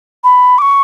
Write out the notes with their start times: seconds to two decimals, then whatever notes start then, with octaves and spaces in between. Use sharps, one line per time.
0.24 B5
0.58 D6
0.62 C#6